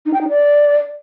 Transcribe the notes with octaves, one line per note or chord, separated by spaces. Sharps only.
D#4
G5
D#4
D5